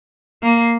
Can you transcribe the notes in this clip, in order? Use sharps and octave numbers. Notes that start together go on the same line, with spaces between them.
A#3